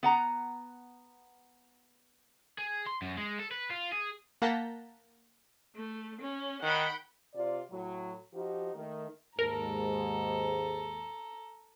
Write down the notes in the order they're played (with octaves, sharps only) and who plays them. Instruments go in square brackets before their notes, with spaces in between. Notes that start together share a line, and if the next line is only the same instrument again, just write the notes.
[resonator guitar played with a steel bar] B3 F#5 A#5
[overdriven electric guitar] G#4
C6
F#2
G#3
A4
B4
F4
G#4
[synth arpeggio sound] A#3 F#5 A5 A#5 G6 B6
[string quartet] A3
C#4
[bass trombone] D#3 [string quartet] F#5 G5 B5
[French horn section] C3 F4 D5
A2 F#3
F3 D#4 F#4 G4
D#3 A3
[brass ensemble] D#2 G#2 [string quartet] A4 A#5 [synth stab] A#4